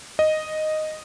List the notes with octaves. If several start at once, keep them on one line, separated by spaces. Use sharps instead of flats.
D#5